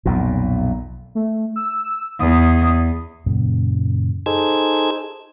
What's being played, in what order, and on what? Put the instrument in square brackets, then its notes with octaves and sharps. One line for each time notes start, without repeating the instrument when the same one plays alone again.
[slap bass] B1 F2 A#2
[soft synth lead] A3
E6
[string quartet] E2 [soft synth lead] D#6
[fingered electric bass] F#2 A#2 C#3
[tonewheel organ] D#4 G#4 A4 C5 E6 G#6